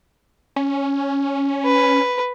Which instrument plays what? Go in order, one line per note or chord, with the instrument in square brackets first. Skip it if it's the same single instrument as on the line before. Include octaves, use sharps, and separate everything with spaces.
[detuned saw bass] C#4
[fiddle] B4